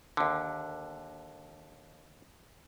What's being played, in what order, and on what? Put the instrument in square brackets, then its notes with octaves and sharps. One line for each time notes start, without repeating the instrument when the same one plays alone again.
[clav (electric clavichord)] D#2 D3